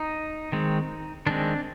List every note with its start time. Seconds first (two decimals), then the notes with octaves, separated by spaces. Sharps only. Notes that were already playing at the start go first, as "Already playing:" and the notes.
Already playing: D#4
0.52 D#3 G#3 C4
1.26 D#3 G#3 C4 D4